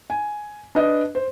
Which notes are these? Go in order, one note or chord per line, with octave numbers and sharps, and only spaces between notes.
G#5
D4 B4 D#5
C5